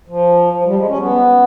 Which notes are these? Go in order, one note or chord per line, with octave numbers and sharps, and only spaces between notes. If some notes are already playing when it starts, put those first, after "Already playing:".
F3
F3
G3
G#3
C#4
B3